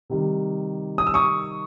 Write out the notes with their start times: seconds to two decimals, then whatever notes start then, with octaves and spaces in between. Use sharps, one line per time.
0.10 C3 D#3 G3
0.98 D#6
1.07 E6
1.14 C#6 D#6